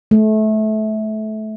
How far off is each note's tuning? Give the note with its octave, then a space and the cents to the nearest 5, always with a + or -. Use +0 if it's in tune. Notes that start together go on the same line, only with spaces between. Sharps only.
A3 -25